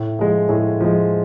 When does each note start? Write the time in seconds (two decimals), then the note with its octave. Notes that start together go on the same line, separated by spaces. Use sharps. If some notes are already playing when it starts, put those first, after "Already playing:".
Already playing: A2
0.19 F3 G#3 G#4
0.49 A2 G#4
0.80 F3 G#3